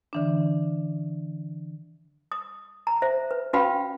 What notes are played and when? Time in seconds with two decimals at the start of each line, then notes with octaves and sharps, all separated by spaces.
0.13 D3 E3 D4
2.32 D#6
2.87 A#5
3.02 C5 E5
3.31 B4
3.53 C#4 F#4 B4 F5 G5 B5